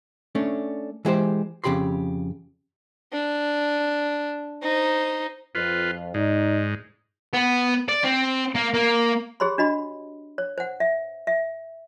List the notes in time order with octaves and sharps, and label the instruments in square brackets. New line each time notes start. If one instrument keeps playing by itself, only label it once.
[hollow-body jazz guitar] A3 C#4 D4
E3 G#3 G4 C5
F2 C#3 G4 B5 C6
[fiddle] D4
D#4 C5
[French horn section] F2 [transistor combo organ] F4 B4
[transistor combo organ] G#2 [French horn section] D#4 D5
[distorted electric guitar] B3
D5
C4
A#3
A#3
[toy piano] G4 G#4 C#5 B5 C6
D4 F#4 D#5 B5
C#5
C5 F#5
E5
E5